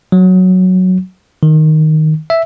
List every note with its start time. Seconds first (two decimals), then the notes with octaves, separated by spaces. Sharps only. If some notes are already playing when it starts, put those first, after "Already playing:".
0.12 F#3
1.43 D#3
2.30 E5